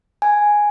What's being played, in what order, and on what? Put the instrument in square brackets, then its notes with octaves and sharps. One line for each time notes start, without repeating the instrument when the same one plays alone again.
[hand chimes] G#5